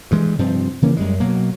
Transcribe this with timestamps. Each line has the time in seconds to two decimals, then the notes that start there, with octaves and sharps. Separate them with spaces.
0.11 G2 E3 G#3
0.39 G2 C3 F3 C4
0.82 C#3 E3 A#3 C#4
0.97 F#2 G3 G#3
1.20 B2 F#3 A#3